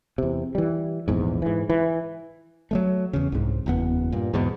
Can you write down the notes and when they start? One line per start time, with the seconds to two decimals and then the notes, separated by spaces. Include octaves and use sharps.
0.18 E2 C3
0.55 E3 G3
1.08 A#1 E2 G#2
1.42 G#2 E3
1.70 E3
2.71 F#3 G#3 A3
3.13 E2 C#3
3.32 C2 G#2
3.66 F#1 E2 B3
4.12 G2 A#2
4.34 E2 G#2 B2